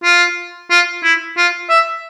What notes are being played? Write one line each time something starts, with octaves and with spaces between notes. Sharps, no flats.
F4
F4
E4
F4
E5